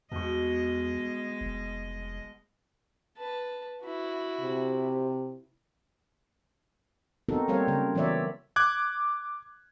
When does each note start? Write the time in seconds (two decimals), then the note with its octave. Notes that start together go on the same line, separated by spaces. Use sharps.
0.12 E2 B2 G#3 D#5 C#6
1.41 F1
3.18 B4 A5
3.83 E4 F#4
4.41 C3
7.29 B3 C4 D#4 F#4 A4 A#4
7.48 G3 A#3 C4 A#4 C#5 F5
7.68 C#3 F#3 A#4
7.95 E3 F#3 B3 C#5 D5 E5
8.56 D6 F#6 G#6